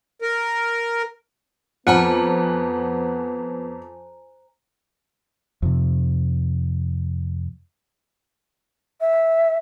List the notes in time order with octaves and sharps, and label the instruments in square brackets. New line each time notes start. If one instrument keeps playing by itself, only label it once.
[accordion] A#4
[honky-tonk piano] F2 [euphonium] B3 [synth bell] C5 G#5 A#5 [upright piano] F#5
[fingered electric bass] F2 C3
[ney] E5